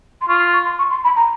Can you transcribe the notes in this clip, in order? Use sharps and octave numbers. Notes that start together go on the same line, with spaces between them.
C6
F4 C#6
C6
C#6
C6
C#6
C6
B5
A#5